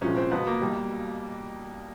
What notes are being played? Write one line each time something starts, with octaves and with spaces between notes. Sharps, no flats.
C2 A#2 F3 G#3 C#4
C4
C#2 B2 F#3 B3
A#3
B1 B2 G3